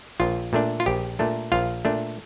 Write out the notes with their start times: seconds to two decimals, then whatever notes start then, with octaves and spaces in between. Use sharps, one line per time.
0.20 A#1 F4
0.53 A#2 A3 D4
0.80 F4
0.86 A#1 G4
1.19 A#2 A3 D4
1.52 A#1 F4 F5
1.85 A#2 A3 D4